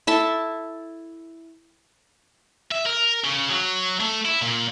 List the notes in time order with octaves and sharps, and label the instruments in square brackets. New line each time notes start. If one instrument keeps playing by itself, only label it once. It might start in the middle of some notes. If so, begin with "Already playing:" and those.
[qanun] E4 A4 E5 A5
[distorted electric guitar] E5
A#4
C#3
F#3
A3
E4
A#2